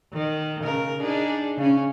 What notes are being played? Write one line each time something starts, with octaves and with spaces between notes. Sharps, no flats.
D#3
C#3 A#4
D4 D#4 G#4
C#3 C#4